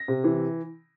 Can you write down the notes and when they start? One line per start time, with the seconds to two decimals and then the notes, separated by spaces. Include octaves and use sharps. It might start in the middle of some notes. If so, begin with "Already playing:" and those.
Already playing: A#6
0.08 C3
0.24 E3